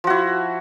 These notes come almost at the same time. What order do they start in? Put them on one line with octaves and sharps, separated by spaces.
F3 F#4 E4